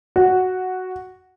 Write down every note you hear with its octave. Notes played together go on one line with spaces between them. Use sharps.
F#4